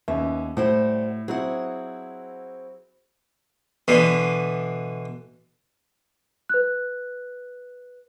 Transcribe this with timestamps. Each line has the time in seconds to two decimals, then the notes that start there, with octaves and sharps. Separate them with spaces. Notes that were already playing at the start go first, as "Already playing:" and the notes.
0.08 D#2 B3 C#4 E5
0.57 A2 G3 C5 F#5
1.28 F#3 C4 E4 G#4 F#5
3.88 B2 D3 E3
6.49 B4 F#6